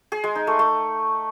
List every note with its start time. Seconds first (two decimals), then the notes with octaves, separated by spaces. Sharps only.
0.12 G#4
0.24 G#3
0.35 D#4
0.47 A3
0.59 A3